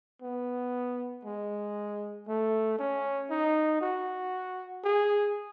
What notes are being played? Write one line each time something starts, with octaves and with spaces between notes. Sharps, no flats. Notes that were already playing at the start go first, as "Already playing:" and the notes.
B3
G#3
A3
C#4
D#4
F#4
G#4